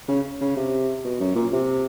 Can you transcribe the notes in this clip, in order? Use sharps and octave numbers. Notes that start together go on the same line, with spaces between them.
C#3
C#3
C3
B2
F#2
A#2
C3